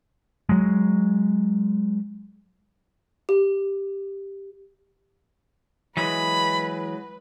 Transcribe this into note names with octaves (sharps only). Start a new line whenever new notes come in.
F#3 G#3
G4
E3 F#3 G#3 B4 B5